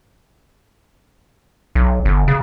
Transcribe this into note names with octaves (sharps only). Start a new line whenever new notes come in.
B1
G1
C#3